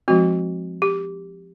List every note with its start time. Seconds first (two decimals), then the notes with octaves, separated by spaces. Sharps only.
0.08 F3 G#3 C4 F#4
0.82 G4